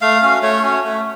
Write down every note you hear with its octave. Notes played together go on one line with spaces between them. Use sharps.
A3 F5
C#4 F#4
A3 C#5
C#4 F#4
A3